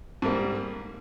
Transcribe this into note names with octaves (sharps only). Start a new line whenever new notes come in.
G#2 G3 A#3